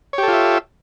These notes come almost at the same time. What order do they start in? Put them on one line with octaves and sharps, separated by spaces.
C#5 G4 A4 F4 E5